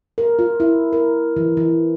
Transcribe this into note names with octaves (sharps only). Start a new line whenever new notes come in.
A#4
F4
E4
A#4
E3
E3